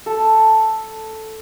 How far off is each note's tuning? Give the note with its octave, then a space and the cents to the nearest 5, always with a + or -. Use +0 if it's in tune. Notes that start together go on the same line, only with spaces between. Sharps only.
A4 +0